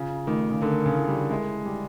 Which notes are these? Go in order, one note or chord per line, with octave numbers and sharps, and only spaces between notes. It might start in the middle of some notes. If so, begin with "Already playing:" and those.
Already playing: C#3 F4
D#3 A3
C#3
D3 A#4
C#3
E4
G3
G#3 E5
G3 G#4